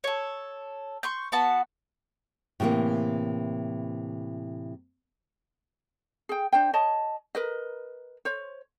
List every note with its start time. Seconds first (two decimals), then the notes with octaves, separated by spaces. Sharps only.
0.04 A4 C#5
1.03 C6 C#6 G6
1.32 B3 F#4 A5
2.60 A2 C3 E3 G#3 A#3
6.29 G#4 G5
6.53 D4 C5 G5
6.73 C#5 D#5 A5
7.35 A#4 B4 D#5
8.25 C5 C#5